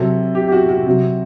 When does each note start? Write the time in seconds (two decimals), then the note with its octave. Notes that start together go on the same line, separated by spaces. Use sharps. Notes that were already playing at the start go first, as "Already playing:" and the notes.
Already playing: C3 F#3 A4
0.35 G4
0.48 G4
0.52 F#4
0.69 F#4
0.86 C3 F#3